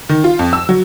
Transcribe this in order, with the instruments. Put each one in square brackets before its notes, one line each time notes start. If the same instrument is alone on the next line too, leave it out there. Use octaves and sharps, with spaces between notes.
[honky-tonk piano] D#3
F4
F2
E6
F#3